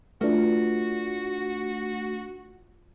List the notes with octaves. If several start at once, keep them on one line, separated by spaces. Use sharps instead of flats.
A3 D4 F4 F#4 B4